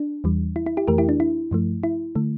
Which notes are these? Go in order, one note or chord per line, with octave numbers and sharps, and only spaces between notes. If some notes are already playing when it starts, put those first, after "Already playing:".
Already playing: D4
E2 E3 G3
E4
E4
E4 G4
F2 E3 A3 G4 A#4
E4 G4
D4
E4
G2 F3 A3
E4
D3 A3